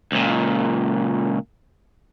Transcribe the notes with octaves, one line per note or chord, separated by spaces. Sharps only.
C#2 A#2